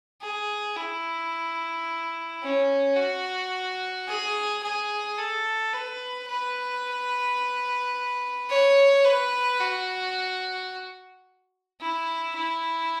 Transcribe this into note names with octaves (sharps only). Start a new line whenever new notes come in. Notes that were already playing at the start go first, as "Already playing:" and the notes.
G#4
E4
C#4
F#4
G#4
G#4
A4
B4
B4
C#5
B4
F#4
E4
E4